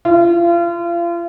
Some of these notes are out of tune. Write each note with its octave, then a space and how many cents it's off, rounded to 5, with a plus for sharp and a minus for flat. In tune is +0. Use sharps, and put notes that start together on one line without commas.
F4 -35